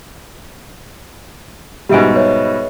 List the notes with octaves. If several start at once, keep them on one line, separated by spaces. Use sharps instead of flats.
G#2 B2 G3 G4 E5 D7
B4 C#5 E5